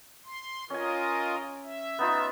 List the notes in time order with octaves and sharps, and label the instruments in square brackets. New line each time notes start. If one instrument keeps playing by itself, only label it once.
[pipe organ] C6
[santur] C#4 G#5 [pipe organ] F4 A#4 D#5
[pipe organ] E5
[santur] B3 D#4 F4